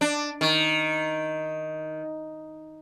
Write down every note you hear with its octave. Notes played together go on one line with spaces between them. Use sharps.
D4
D#3